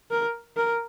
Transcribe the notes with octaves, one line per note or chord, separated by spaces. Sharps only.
A#4
A#4